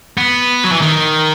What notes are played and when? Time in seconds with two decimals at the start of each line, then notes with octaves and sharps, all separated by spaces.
0.18 B3
0.64 F#3
0.72 E3
0.81 D#3